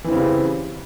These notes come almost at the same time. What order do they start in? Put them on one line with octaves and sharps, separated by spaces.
E3 C4 C#3 G3